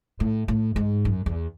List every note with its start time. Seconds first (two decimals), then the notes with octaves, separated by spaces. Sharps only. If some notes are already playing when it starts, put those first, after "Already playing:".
0.20 A2
0.48 A2
0.76 G#2
1.05 F#2
1.26 E2